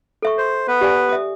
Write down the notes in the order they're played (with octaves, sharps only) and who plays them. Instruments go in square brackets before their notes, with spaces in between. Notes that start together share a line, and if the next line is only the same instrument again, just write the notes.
[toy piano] A4 E5 C#6
[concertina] C5
B3 B4
[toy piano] G4 D5 G#5
E5 D#6